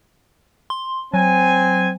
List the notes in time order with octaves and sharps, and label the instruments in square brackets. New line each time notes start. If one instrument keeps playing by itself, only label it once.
[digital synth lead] C6
[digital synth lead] F#3 [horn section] C4 G#5